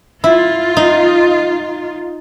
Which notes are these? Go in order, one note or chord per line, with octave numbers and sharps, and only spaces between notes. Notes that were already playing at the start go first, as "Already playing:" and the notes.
E4 F4
D#4